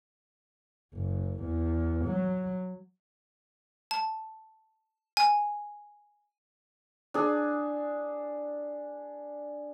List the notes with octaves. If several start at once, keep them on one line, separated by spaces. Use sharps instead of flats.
F#1
E2
F#3
A5
G#5
D4 G#4